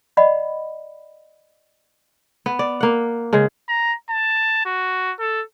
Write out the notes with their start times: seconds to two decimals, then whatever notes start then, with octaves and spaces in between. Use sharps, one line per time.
0.17 D5 D#5 F#5 B5
2.46 B3
2.59 D5
2.81 A#3 F#5
3.33 C#3 G#3
3.68 A#5
4.10 A5
4.65 F#4
5.19 A4